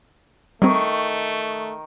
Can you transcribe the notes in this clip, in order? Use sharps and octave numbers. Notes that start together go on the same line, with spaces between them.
D#3 G3 A3 C4 C#6